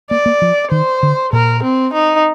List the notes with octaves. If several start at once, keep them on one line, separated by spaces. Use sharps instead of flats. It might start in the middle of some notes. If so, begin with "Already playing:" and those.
A#3 D5
A#3
F3
D#3 C5
D3
A#2 A#4
C4
D#4